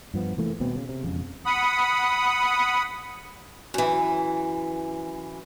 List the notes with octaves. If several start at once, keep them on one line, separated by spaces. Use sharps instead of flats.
G2 F3 B3
F1 E3 A3 A#3
D#1 B2 B3 C4
C#3
C3
E1 F2 C#3
F#5 B5 D#6
F#2 E3